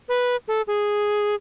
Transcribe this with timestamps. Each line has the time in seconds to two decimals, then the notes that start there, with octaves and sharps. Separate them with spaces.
0.09 B4
0.48 A4
0.67 G#4